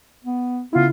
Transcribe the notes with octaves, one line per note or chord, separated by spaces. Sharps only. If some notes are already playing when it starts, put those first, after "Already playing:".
B3
C#3 B3 E4 F4